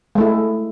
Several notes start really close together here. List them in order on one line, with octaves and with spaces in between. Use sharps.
G#3 A3 E4